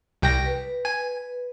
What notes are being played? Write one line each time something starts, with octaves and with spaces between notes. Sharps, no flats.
C2 G5 A#6
B4
G#5